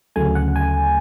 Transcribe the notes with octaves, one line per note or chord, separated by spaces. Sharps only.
D2 C#3 F#3 A3 G#5
F#5
G#5